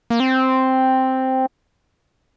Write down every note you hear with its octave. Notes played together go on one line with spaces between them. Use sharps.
A#3
C4